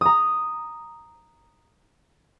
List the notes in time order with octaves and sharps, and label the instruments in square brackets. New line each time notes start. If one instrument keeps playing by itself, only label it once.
[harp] A#5 D#6